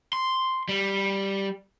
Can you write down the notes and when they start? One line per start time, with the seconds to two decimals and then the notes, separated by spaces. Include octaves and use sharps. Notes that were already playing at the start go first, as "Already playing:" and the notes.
0.13 C6
0.69 G3